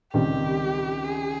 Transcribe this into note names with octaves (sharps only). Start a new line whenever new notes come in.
C#2 C3 D#3 G3 C4 G4
G#4